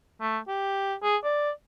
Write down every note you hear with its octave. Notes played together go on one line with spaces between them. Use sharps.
A3
G4
G#4
D5